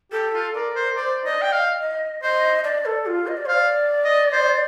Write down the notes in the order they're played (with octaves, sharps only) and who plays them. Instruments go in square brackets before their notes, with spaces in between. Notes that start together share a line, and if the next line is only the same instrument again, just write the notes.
[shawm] G4 [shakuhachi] A4
[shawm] F4
[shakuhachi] A#4 [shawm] D5
[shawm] C5
[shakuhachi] C5 [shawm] D5
[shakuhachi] D5 [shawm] D#5
[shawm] G5
[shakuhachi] D#5 [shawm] F5
[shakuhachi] D#5
[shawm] C5 [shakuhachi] D#5
[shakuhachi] D5
A4
F4
D#5
D5
[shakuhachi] C5 [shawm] F5
[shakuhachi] D5
[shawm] D#5
C5